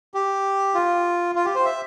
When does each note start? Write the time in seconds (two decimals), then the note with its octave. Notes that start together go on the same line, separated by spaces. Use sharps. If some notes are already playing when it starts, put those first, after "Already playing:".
0.14 G4
0.75 F4
1.35 F4
1.45 G4
1.55 C5
1.66 E5